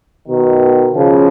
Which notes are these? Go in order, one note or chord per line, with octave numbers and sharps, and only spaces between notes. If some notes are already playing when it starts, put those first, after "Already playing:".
B2 D#3
C#3 F3